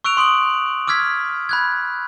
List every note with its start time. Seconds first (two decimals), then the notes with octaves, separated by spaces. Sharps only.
0.04 C#6 E6 F#6 D7 F7
0.17 C6 D#6 D7 F#7
0.88 D6 E6 F6 G#6 B6
1.49 B5 F#6 G#6